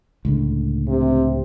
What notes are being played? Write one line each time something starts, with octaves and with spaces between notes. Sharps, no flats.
C#2 A2 D3
C3